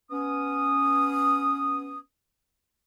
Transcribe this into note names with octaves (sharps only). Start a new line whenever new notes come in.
B3 C#4 D#6